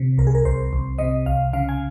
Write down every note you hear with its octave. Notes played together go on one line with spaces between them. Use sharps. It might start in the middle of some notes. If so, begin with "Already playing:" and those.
Already playing: C3
C2 A#4
G#4
A#4
C2 C5
C2
C3 D#5
C2 F5
C#3 F5
G#5